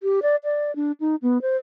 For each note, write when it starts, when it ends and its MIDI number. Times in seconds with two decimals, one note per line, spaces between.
0.03 0.20 67
0.22 0.36 74
0.44 0.74 74
0.76 0.92 62
1.00 1.15 63
1.22 1.41 59
1.42 1.56 72